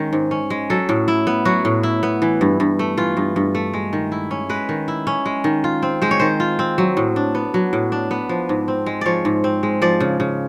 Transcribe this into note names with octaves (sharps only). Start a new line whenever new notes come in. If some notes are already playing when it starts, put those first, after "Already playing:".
Already playing: D#3 G#3 C#4
G#2
C#4
G#3
F#3 A4
A2
E4
B3
F#3 F#4
A2
E4
B3
E3
G2
G2
A3
E3 F4
G2
G2
A3
G#3
D#3
E4
C#4
G#3 B4
D#3
E4
C#4
G#3
D#3
F4
C4
G#3 C5
C#5
D#3 C5
F4
C4
F#3
A2
D4
B3
F#3
A2
D4
B3
F3
G#2
C4
G#3
F3 C#5 D5
G#2
C4
G#3
F3 D5
C#3
C#3